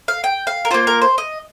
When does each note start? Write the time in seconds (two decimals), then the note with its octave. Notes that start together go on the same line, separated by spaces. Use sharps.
0.08 F5
0.24 G5
0.47 F5
0.65 A#4
0.71 A#3 F4 C5
0.87 A#4
1.02 C5
1.18 D#5